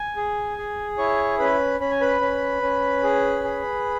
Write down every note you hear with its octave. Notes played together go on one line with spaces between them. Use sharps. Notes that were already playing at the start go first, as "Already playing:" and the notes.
Already playing: G#5
G#4
G#4
E4 C#5 C#6
C#4 B4 B5
C#4 B5
G#5
B4 B5
C#4
C#4
G#4
G#4